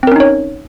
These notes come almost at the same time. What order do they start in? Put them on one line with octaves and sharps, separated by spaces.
C4 A#4 C#4 D#4 C#5